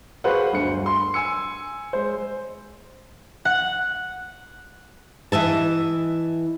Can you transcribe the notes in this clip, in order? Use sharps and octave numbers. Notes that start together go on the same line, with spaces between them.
F#4 G#4 B4 C5 F5 F#5
G1 D2 C#7
C6
G#5 E6 C#7
G#3 C5
F#5
E3 D#5 E5 A5